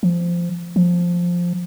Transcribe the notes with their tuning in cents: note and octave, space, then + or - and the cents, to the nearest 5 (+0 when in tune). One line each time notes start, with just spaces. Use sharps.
F3 -15
F3 +5